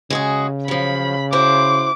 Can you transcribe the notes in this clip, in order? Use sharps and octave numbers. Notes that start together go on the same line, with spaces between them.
C#3 G#3 F#4 G#4
F3 F#3 B5
E4 F#4 C5 D6